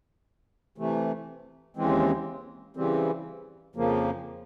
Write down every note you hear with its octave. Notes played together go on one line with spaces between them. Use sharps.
C3 E3 A3
D#2 C#3 E3 G#3 C4
C#3 E3 G3 C4
F2 C#3 F3 A#3